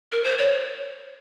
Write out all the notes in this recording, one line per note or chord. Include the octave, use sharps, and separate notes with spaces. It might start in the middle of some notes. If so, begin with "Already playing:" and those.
A#4
C5
C#5